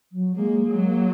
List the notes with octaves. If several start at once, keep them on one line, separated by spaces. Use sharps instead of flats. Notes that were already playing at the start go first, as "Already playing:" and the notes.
F#3
G#3 A#3
G#3
F#3
A#3